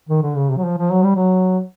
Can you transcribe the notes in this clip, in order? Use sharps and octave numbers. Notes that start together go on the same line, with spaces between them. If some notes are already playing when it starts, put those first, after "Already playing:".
D#3
D3
C#3
C3
F#3
F3
F3
F#3
G3
F#3